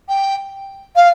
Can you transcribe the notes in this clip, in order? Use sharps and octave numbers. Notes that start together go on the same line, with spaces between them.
G5
F5